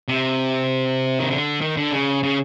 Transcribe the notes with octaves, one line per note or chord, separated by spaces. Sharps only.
C3
D#3
D3
D#3
D3
C#3
C#3